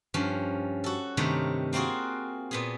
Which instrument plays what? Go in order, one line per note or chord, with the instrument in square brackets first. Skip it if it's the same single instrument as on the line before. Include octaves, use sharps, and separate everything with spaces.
[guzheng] G2 F3 C#4
F#4 A4
G2 C3 D#3 A3 A#4 C#5
A#3 C4 F4 F#4 G#4
A#2 B3 G#4